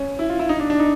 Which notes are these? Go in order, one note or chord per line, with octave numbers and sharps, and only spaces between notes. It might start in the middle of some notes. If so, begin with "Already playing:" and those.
Already playing: C#4
E4
F4
E4
D#4
D4
D4
D#4